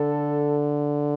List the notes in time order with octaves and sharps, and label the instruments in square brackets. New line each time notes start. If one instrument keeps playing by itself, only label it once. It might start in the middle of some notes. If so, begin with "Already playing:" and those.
Already playing: [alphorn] D3 [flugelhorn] A4